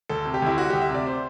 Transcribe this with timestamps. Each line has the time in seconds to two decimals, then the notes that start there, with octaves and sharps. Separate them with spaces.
0.09 D2 A4
0.25 C3
0.34 G4
0.42 D2 E4
0.58 G3 F#4
0.70 D2 G4
0.82 E5
0.90 C3 D5
1.07 C5